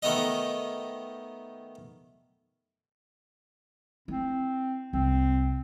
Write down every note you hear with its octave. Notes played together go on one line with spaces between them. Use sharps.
D#3 A3 B3 D#5
C4 E4
C2 C4